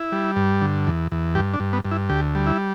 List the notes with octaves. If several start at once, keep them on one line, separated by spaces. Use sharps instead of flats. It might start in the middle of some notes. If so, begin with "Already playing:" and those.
Already playing: E4
G3
G2
D3
E2
E2
G2 G4
D4
G2
B3
G2
E4
D2 G4
G3
E4